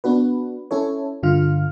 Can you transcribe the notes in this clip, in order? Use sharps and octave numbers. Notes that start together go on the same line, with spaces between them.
B3 D4 F#4 B4
C#4 E4 A4 C#5
G2 D3 F4 F6